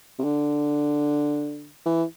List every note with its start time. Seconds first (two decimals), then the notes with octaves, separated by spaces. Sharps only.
0.19 C3
0.24 D3
1.86 E3